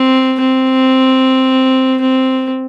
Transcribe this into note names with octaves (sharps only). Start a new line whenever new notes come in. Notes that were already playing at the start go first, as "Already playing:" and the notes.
Already playing: C4
C4
C4